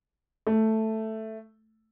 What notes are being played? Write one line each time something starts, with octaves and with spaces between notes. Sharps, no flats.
A3